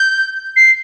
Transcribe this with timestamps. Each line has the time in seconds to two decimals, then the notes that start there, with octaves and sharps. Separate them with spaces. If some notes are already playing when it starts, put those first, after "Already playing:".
Already playing: G6
0.56 C7